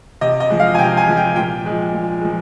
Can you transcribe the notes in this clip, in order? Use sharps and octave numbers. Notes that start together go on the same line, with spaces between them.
C3 D#5
D#5
F3 G#3
F5
G#5
C3 G5
G#5
F3 G#3
G5
A#2 G5
F3 G#3
A#2
F3 G#3